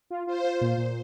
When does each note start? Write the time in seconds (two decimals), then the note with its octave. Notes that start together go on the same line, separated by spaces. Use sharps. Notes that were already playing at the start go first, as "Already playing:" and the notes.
0.10 F4
0.27 F4 C5
0.44 F4
0.61 A#2
0.78 A#2